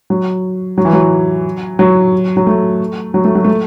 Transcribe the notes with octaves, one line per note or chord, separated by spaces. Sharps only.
F#3
F#3
E3
F#3
F#3
F#3
A3
F#3
A3
F#3
A3